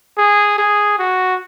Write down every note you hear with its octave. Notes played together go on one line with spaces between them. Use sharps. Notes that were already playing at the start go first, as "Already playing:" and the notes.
G#4
G#4
F#4